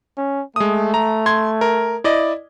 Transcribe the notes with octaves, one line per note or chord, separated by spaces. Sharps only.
C#4
G#3 A3 D#6
A#5
C6 G#6
A#4
E4 D5 D#5